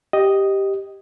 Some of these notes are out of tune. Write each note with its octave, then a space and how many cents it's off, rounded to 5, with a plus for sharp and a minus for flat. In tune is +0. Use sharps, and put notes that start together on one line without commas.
G4 +0 D#5 +0